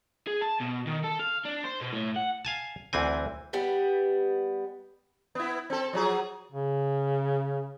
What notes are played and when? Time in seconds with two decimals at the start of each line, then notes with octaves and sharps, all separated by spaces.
0.28 G#4
0.42 A5
0.61 B2
0.87 D#3
1.04 A4
1.19 F5
1.45 D4
1.64 C5
1.81 B2
1.93 A2
2.16 F#5
2.45 F5 G#5 A5
2.93 D2 E3 C4 G#5
3.53 G3 B3
5.35 B3 E4
5.70 C4 A4
5.93 F3 F#3 G#4
6.52 C#3